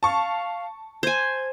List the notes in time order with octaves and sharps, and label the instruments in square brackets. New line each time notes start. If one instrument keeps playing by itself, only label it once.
[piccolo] F5 [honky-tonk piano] A5 C#6
[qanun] C5 G#5 [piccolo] G#6